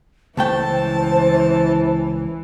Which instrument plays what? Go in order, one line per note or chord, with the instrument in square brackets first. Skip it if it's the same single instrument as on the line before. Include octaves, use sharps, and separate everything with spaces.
[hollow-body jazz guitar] C#2 A3 G5 [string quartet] E3 [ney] C5 [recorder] A5